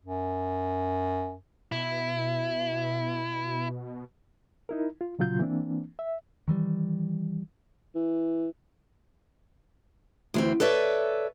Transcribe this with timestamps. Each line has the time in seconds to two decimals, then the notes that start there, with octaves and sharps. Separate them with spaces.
0.05 F#2
1.72 B2 E4
4.69 D#4 E4 A#4
5.01 F4
5.19 A#2 C#3 F#3 F4 G6
5.39 E3 A#3 C4 D4
5.99 E5
6.48 D#3 E3 G3
7.95 E3
10.34 D2 E3 C4
10.60 A4 B4 C#5 D5 E5